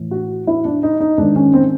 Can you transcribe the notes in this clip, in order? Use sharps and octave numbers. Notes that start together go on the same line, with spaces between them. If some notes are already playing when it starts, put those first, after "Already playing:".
Already playing: A2 E3
F#4
E4
D4
D#4
D#4
G#2 D#3 D4
C#4
C4